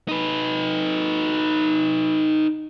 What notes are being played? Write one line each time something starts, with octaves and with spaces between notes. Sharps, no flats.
D#4 B4